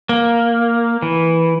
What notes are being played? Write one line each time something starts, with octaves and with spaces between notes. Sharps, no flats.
A#3
E3